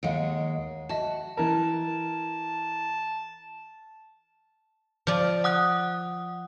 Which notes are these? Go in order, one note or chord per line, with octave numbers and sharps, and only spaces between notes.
D#2 G#3 F5 F#5 D7
F#4 D#5 E5 A5
E3 A#4 A5
F3 D5
F#5 D#6 F#6